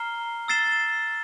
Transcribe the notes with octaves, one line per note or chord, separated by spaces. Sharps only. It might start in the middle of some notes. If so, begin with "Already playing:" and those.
Already playing: A#5 F6 C7 G7
E6 A6 C7 E7 G7